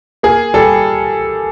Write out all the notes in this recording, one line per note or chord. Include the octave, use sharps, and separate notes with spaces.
A#3 G#4
G3 A4